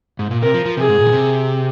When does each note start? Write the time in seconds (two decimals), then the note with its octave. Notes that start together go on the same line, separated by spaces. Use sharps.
0.19 G#2
0.31 A#2
0.42 C3 A#4
0.54 F3
0.66 F3
0.77 C3 G#4
0.89 G#2
1.00 A#2
1.06 D#3
1.12 C3